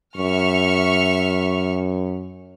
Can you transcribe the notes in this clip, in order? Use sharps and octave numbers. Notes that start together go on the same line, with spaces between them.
F#2 E5 C#6 F6